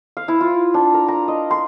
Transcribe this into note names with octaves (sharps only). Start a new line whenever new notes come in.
F5
E4
F4
D4
A#4
A#5
D#5
C6